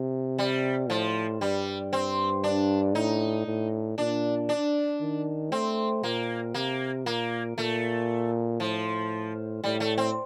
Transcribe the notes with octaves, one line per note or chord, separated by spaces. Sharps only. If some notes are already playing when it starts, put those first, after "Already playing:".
Already playing: C3
G3
A2 F3
G2 G3
C4
D4
A2 D#4
A2
A#2 D4
D4
D#3
A3 C4
A#2 A#3
C3 A#3
A#2 A#3
A#2 A3
A2 F3
A2 G3
A3
C4